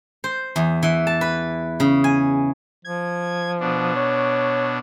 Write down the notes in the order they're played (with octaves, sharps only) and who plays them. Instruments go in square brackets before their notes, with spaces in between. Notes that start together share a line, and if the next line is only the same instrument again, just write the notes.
[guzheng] C5
E2
E3
A5
B4
C#3
G#5
[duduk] F3 [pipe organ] G#6
[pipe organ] B2 D4
[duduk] C#5